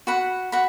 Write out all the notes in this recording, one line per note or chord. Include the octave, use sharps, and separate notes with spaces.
F#4 F#5 B5
F#4 F#5 B5